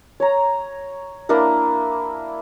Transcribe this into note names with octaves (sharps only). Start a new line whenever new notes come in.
C#5 A#5
A#3 D4 E4 A#4